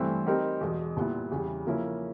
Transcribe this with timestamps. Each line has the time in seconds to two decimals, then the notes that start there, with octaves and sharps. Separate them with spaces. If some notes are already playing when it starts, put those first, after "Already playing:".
Already playing: G2 E3 A3 C4 E4
0.26 G3 C4 D#4 G4 A#4
0.61 E2 B2 G#3
0.97 A#2 G3 B3 E4
1.32 E2 C#3 E3 G3
1.66 C#3 F3 A#3 C#4 E4